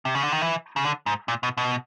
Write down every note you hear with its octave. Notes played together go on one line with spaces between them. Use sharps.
C3
C#3
D3
D#3
E3
C#3
D3
G#2
A#2
B2
B2